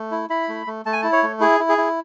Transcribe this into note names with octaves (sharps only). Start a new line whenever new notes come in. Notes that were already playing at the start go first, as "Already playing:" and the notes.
Already playing: A3
E4
E4 B5
A3
A3
A3 A5
G#5
E4 A5
C#5
A3
E4 G#4
E4
G#4
E4